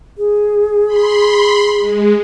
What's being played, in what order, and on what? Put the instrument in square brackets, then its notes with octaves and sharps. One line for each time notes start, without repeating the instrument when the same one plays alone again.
[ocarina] G#4
[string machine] B5 C6
G#3